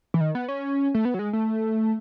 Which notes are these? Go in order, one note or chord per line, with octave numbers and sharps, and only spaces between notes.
E3
D#3
B3
C#4
A3
B3
F#3
G#3
A3